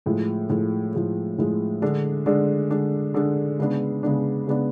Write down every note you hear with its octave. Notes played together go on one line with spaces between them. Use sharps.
A2 F3 G#3
A2 F3 G#3
A2 F3 G#3
A2 F3 G#3
D3 G#3 D4
D3 G#3 D4
D3 G#3 D4
D3 G#3 D4
C#3 G#3 B3 D4
C#3 G#3 B3 D4
C#3 G#3 B3 D4